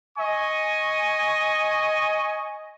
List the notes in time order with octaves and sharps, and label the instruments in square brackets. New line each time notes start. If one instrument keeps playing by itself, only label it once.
[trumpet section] D#5 G#5 C#6